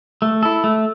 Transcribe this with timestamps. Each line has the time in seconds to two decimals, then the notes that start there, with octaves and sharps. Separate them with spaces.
0.22 A3
0.43 E4 A4
0.64 A3